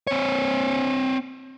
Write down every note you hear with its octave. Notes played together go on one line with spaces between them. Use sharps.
C4 C#5